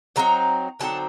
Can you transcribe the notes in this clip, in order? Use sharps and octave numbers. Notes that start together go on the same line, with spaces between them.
D3 F#3 C4 D#4 A#5
D3 F#3 C4 D#4 A5